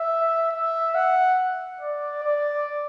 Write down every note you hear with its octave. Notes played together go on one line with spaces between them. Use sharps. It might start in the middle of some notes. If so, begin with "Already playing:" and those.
Already playing: E5
E5
F#5
D5
D5